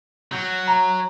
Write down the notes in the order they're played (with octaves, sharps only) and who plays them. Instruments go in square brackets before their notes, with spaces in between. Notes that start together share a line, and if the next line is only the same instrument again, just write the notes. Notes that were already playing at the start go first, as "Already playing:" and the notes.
[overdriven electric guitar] F#3 [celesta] G6
[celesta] A#5